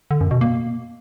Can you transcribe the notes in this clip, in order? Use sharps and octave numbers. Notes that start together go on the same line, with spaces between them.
D3
F#2
B2
A#3